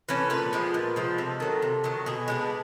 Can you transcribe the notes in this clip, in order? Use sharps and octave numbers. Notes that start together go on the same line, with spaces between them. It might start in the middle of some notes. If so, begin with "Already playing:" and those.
E3 A3 C#4
A#2 B4
F3 G#3 B3
A#2
F3 G#3 B3
C3 A4
D#3 F#3
C3
D#3 F#3
B2 G#4
G#3 B3 D4